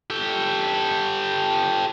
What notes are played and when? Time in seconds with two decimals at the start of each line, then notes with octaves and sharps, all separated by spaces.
0.10 G4 A4